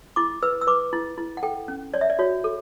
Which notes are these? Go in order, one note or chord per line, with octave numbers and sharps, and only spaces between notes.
E4 D6
B4 E6
E6
B4 D6
E4
E4
F#5
A4 G5
C#4
C#5 D5
E5
D5
F#4 C#5
A4